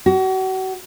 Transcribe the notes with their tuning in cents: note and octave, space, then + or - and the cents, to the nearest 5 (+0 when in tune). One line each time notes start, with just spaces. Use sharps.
F#4 +35